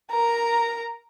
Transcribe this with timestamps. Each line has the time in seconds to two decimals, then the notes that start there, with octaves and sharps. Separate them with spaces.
0.11 A#4 A#5